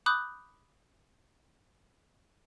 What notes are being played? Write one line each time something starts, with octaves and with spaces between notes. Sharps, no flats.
B5 D6 D#6 F#6 G6